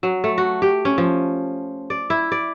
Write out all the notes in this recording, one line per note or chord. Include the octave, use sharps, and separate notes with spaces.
F#3
A3
F#4
G4
C#4
F3
D5
E4
D5